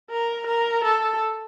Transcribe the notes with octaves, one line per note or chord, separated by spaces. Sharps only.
A#4
A#4
A4